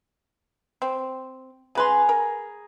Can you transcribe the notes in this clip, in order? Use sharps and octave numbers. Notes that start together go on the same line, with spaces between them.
C4
C#3 G#4 B4 G#5 A#5 C6
A#4